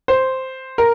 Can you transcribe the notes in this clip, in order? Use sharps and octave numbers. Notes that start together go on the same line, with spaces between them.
C5
A#4